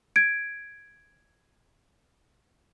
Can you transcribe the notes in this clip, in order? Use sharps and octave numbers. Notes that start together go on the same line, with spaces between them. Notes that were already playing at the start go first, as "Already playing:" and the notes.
G#6 D7